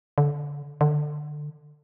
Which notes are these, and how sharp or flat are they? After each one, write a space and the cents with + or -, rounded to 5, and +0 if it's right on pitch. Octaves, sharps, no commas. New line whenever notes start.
D3 -15
D3 +20